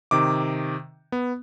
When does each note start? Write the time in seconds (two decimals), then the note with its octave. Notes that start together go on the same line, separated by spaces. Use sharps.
0.11 C3 D#3 D6
1.12 B3